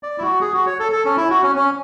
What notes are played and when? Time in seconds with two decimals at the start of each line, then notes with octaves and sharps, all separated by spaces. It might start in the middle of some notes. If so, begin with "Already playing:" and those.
0.03 D5
0.18 E4
0.22 F#4
0.41 G#4
0.54 F#4
0.66 C#5
0.80 A4
0.92 A4
1.05 C#4
1.17 E4
1.30 F#4
1.43 C#4
1.56 C#4